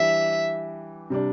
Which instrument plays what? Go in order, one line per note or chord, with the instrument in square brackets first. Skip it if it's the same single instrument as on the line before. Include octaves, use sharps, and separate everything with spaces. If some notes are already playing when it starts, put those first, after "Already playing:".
Already playing: [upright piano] E3 G3 D4 G4 [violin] E5
[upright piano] C3 G3 D4